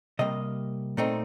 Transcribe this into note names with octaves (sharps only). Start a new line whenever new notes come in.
C3 G3 A#3 D#5
A#2 A3 C4 D#4